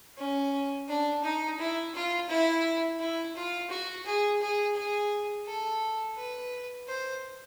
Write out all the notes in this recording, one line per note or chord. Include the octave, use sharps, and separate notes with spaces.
C#4
D4
D#4
E4
F4
E4
E4
F4
F#4
G#4
G#4
G#4
A4
B4
C5